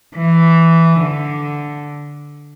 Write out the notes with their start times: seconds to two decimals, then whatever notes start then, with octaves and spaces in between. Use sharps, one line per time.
0.16 E3
1.00 D3